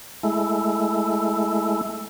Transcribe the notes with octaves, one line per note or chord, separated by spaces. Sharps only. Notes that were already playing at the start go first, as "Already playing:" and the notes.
G#3 A3 E4